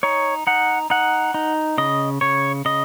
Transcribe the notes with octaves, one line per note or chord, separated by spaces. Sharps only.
D#4 C#5
D#4 F#5
D#4 F#5
D#4
C#3 D#5
C#3 C#5
C#3 D#5